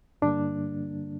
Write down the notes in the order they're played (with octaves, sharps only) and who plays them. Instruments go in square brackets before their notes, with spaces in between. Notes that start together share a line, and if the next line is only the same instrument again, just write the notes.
[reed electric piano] G2 D3 G3 A#3 D4